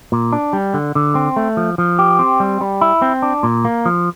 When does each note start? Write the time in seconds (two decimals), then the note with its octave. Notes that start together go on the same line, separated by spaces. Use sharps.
0.12 A#2
0.33 D4
0.53 G3
0.74 D3
0.95 D3
1.15 C4
1.36 A3
1.57 F3
1.78 F3
1.99 G4
2.19 C4
2.40 G3
2.61 G3
2.81 E4
3.02 C4
3.22 D4
3.43 A#2
3.65 A#3
3.85 F3